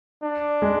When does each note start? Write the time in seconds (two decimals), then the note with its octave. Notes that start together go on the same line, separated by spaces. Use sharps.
0.23 D4
0.62 G#3